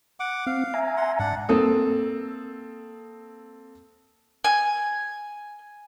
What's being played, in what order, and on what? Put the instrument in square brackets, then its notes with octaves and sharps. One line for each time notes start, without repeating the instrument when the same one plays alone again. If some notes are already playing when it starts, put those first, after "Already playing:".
[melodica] F#5 D6
[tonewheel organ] C4 [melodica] F5
[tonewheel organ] E5 G#5 A#5
[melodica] F#5 C6
[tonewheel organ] G#2 [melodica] D4 F#5
[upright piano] A#3 C4 A4 D#6
[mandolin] G#5